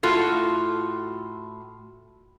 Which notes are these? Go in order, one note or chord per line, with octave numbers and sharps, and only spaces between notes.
A2 F4 F#4 A4